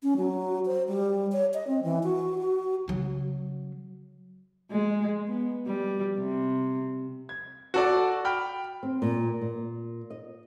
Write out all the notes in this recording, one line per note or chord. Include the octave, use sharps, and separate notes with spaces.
C#4
F#3
C5
G3
C#5
D#5
C4
E3
F#4
F#4
C#3 F#3
G#3
B3
G3
C3
G#6
F#4 A4 D5
G5 B5 F6
C4
A#2
A#2
D#5